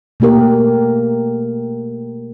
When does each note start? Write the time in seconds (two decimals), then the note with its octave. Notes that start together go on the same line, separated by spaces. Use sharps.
0.20 B2 A3 A#3 G4 A#4